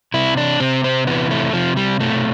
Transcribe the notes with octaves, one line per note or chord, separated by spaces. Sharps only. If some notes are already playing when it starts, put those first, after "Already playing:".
C3 E4
D4
C3 C4
C4
E3 B3
A3
C3 F3
G3
B2 A3